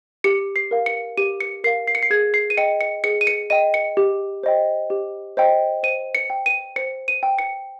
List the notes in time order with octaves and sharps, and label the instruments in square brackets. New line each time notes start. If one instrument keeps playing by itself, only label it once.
[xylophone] G4 C#7
C7
A#4 F5
C#7
G4 D#7
C#7
A#4 F5 C7
C7
C#7
C7
G#4 G#6
C7
D#7
D#5 G5 C#7
C#7
G#4 C#7
D#7
C#7
D#5 G5 D#7
C#7
G4
C5 D#5 G5
G4
C5 D#5 G5
C5 D#7
C#7
G5
D#7
C5 C#7
D#7
G5
C#7